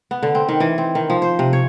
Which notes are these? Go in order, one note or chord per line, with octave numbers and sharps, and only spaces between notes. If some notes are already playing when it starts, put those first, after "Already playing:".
B3
D3
C4
D#3
E3
C4
D#3
F3
C5
C3
C#5